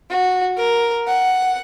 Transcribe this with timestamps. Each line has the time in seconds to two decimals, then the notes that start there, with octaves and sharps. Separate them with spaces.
0.10 F#4
0.57 A#4
1.07 F#5